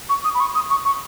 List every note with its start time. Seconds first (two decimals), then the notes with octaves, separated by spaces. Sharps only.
0.09 C#6
0.25 D#6
0.35 B5
0.40 C#6
0.55 D#6
0.70 C#6
0.85 C#6